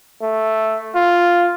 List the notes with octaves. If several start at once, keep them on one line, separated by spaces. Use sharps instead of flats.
A3
F4